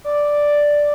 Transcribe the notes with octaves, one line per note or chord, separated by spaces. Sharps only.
D5